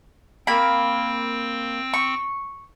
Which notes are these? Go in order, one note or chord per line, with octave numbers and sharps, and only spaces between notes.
A#3 C4 G5 B5
C#6